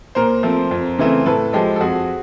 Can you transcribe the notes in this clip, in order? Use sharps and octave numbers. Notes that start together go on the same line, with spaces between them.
A#2 A#4 C5
F3 A3 C4
F2
C#3 E3 A3 C4
A2 A4 B4
F3 G#3 G4 A4
A4
F2 F#4 G#4